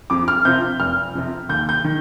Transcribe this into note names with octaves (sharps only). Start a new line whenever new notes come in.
F2 D6
F6
C3 F3 G6
F1 F6
F2 C3
D#2 G6
G6
D#3